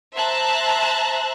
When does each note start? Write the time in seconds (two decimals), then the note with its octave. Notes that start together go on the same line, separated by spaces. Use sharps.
0.15 C5 E5 A5 A#5 F#6